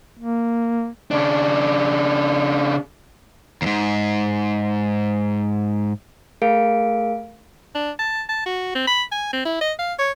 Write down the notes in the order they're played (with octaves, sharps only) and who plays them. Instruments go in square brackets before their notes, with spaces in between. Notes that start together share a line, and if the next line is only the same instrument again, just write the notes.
[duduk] A#3
[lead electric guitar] C#3 D4
[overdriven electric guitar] D#2 G#2
[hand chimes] A3 G#4 A#4 F5 D7
[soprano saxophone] D4
A5
A5
F#4
C4
B5
G#5
C4
E4
D#5
F5
C#5